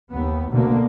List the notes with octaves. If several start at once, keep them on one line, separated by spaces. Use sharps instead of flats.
D#2 B3
D2 B2 D3 A#3